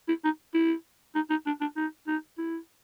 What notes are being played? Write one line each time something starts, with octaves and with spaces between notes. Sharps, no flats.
E4
D#4
E4
D#4
D#4
D4
D4
D#4
D#4
E4